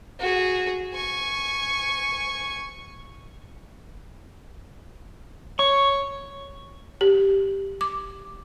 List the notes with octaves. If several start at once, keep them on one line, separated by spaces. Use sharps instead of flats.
F#4 G#4
G#5 C#6
C#5 C#6
G4
D6